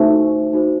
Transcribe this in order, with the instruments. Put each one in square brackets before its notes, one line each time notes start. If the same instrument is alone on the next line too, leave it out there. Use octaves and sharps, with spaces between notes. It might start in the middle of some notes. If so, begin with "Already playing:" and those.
Already playing: [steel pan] A3 [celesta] D#4 F#4 C5
[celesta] D#4 F#4 C5